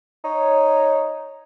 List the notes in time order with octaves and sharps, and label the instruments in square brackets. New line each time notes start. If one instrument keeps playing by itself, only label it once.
[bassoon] D#4 [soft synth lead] C#5